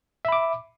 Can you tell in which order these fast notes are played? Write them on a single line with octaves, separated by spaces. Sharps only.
E5 B5 D6